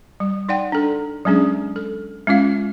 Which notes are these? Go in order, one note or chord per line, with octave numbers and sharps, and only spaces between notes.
G3
D#4 D5 F#5 G5
D4 A4
F#3 G#3 C#4 D4 G#4
A4
G#3 C#4 F4 F5